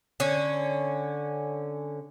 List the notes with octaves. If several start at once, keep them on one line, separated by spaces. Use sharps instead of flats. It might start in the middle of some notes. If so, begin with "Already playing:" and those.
D3 C#4